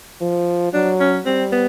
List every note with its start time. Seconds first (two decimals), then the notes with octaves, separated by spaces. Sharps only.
0.21 F3
0.73 F#3 D4
1.00 C#4
1.25 G3 C4
1.52 B3